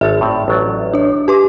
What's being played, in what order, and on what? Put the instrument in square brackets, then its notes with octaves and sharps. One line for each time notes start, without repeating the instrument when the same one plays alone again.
[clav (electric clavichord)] G#1 A4 [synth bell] E5
[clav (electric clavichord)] A2 C4 D5
A1 F#3 D5
[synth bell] D4 C#5
[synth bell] G4 B4 D6 [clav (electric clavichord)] E5